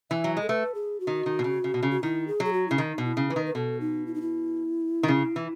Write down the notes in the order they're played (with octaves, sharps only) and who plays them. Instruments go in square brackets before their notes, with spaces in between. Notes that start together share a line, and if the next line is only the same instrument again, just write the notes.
[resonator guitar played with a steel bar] E3 [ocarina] E5
[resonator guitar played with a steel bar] F#3
G#3
[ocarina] A4
[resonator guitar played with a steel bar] A3 [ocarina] B4
[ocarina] G#4
F#4
[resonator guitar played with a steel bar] D#3
D#3
B2
C#3
C#3
B2
C#3
[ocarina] F#4
[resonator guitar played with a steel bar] D#3 [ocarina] E4
[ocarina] G#4
[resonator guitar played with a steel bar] F#3 [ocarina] G#4
[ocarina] F#4
[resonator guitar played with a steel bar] C#3 [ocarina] E4
[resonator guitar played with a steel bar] D#3 [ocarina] D#4
[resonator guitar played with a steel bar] B2
[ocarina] E4
[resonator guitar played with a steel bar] C#3
[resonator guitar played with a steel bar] E3 [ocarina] B4
[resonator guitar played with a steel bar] D#3
[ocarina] B4
[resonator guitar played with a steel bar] B2 [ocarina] A4
[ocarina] D#4
E4
D#4
E4
[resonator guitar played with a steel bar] D#3
C#3
E3